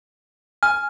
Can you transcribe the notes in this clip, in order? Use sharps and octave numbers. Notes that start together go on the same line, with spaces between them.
G#5 F6